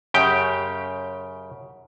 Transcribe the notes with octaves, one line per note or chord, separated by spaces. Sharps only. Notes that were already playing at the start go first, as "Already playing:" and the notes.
F#2 C#3 G4 G5